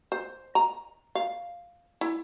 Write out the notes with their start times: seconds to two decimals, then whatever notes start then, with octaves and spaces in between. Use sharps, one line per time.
0.12 C5
0.55 A#5
1.15 F5
2.01 E4